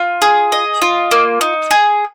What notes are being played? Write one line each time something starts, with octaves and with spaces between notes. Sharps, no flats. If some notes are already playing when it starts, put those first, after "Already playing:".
Already playing: F4
G#4
D#5
F4
A#3
D#4
G#4